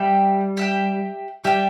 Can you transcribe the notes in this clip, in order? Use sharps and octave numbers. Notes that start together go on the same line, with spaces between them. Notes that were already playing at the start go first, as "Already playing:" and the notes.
Already playing: G3 G4 E5 G5
G4 E5 G5
G3 G4 E5 G5